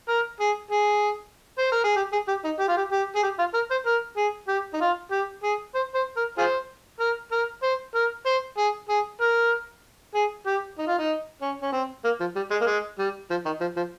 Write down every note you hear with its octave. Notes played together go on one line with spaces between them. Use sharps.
A#4
G#4
G#4
C5
A#4
G#4
G4
G#4
G4
D#4
G4
F4
G4
G4
G#4
G4
F4
A#4
C5
A#4
G#4
G4
D#4
F4
G4
G#4
C5
C5
A#4
F4 G#4 C5
A#4
A#4
C5
A#4
C5
G#4
G#4
A#4
G#4
G4
D#4
F4
D#4
C#4
C#4
C4
A#3
F3
G3
G#3
A#3
G#3
G3
F3
D#3
F3
F3